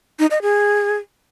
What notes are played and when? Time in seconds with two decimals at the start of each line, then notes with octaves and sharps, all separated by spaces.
0.19 D#4
0.31 D#5
0.42 G#4